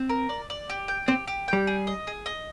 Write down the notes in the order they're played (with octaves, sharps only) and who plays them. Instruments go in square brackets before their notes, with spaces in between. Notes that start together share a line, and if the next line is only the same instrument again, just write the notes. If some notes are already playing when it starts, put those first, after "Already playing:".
Already playing: [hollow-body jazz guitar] C4
[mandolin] A#4
D5
D5
G4
G5
[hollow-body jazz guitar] C4 [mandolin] G4
[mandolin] G4
[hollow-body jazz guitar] G3 [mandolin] G5
[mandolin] G#4
D#5
G#4
D#5